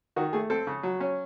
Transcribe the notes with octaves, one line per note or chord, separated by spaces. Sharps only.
D#3 F#4
A3 G#4
C4 A4
C#3
F#3
C#4